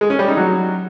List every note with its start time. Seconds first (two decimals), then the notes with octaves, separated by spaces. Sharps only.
0.01 G#3
0.10 C#4
0.19 G3
0.28 D#4
0.37 F#3